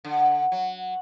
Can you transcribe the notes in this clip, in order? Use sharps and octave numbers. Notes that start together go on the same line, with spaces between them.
D3
F#3